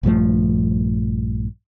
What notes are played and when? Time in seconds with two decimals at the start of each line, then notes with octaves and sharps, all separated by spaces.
0.03 A#1 G2 F3 A3